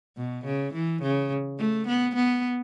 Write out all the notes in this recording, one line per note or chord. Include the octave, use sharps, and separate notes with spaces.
B2
C#3
E3
C#3
A3
B3
B3